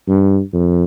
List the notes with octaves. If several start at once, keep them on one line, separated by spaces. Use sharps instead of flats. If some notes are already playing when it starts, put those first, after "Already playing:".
G2
F2